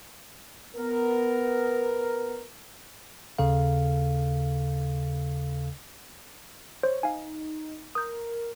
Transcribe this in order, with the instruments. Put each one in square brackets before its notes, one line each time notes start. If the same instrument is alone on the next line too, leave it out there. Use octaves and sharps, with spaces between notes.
[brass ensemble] B3 A#4
[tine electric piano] D#2 C#3 A4 F5
[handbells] C5 [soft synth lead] C#5
[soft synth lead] D#4 [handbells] F5 G#5
[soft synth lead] A#4 [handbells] D#6 G6